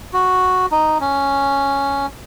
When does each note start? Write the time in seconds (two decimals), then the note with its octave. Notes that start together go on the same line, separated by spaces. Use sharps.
0.13 F#4
0.72 D#4
1.01 C#4